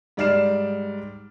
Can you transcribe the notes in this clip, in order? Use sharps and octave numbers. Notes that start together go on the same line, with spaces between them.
G#2 G3 D5 F6 C7 E7